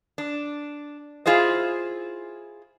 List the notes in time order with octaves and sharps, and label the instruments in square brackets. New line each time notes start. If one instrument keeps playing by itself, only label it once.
[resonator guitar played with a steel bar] D4
E4 F4 G#4 C5 D#5